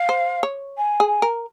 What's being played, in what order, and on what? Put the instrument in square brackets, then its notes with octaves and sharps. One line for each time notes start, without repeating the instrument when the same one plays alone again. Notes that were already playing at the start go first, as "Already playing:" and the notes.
Already playing: [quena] F5
[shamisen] C5
C#5
[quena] G#5
[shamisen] G#4
A#4